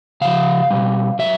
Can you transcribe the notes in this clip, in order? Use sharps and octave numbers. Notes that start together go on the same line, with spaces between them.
C#3 F3 F5
B2 G3
F#3 E5